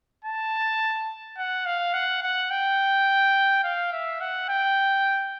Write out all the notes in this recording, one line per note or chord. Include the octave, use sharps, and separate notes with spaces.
A5
F#5
F5
F#5
F#5
G5
F5
E5
F#5
G5